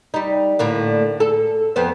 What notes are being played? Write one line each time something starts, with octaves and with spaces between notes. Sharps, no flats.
G3 D#4
A2 D3 A#3
A4
F2 B3 C5